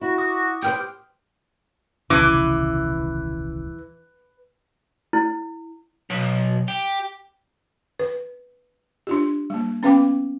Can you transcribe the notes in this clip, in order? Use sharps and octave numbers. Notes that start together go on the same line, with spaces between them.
E4 F#4
D6 D#6 F#6
G4 B4 C5 G5 F6 G6
D#1 C2 C#3 E3 D6
E4
B1
G4
B4
D4 F4 G4
G3 A#3
B3 C#4 B4 F5 G5 D6